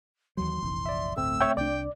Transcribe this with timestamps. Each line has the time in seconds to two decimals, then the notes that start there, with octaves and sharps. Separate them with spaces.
0.37 D#2 E3 F#3 C6
0.62 F1 A#1 E3
0.86 D5 E5
1.17 G1 D2 A2 A3 C4 E6
1.41 C#5 E5 G5
1.57 C2 D4 D5 G5